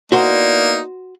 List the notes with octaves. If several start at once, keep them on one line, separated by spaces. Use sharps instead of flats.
A#3 B3 D#4 E4 F#4 C5 D5